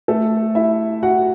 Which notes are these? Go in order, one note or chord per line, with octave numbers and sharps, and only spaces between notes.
A3 A4
E4 E5
F#4 F#5